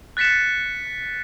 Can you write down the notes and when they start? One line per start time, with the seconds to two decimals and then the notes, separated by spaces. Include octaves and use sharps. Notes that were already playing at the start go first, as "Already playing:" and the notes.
0.17 F#6 A6 B6 C#7 E7